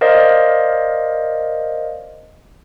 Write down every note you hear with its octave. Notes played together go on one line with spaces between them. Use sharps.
A#4 C5 D5 D#5 F5